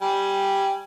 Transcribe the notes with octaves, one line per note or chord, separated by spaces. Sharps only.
G3 G5 G#5